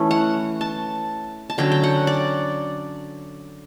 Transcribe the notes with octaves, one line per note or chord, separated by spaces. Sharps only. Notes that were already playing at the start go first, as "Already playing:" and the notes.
Already playing: E3 A3 C#4
F#5
A5
A5
D3 F#3 C#4 G5
G5
F#5
D5